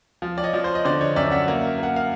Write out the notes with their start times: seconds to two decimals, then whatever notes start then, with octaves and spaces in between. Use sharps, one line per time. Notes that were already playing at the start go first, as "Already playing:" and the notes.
0.22 F3
0.38 D5
0.43 C#5 D#5
0.53 F3
0.64 C5
0.75 D#5
0.85 D3 C5 D5
1.01 C#5 D#5
1.16 F#2 D5 E5
1.31 E5 F#5
1.48 A#3
1.79 A#3 F#5
1.96 F5